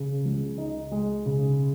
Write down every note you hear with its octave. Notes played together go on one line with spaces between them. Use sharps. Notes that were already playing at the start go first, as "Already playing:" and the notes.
Already playing: C#3
C#2
D#4
G#3
C#3